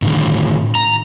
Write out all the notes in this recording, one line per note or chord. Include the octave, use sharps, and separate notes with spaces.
A2 D3 D#3
A#5